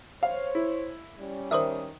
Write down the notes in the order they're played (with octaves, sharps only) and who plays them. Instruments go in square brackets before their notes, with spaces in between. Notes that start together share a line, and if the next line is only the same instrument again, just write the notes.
[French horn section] C5 C#5 [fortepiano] F5
[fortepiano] E4
[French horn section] G3 C#4
[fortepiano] D#3 D#6 [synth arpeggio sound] C5 D5 E5